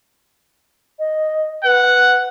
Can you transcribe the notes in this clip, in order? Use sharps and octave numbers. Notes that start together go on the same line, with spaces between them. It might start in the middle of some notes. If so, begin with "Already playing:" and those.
D#5
B4 F#5